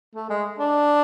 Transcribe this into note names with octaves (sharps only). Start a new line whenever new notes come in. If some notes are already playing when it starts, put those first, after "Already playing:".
A3
G#3
D4